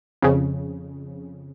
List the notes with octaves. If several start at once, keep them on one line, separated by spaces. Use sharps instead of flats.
F2 C#3